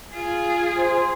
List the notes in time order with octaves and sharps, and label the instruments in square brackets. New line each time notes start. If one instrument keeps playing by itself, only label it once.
[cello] F4 [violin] G#4
[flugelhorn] C5